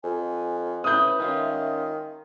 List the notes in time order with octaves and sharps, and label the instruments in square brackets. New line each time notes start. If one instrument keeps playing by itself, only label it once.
[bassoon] F2 [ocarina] G#5
[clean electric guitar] C#4 B4 [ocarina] E5 [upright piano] D#6 G6
[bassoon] D#3 [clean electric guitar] C#4 F4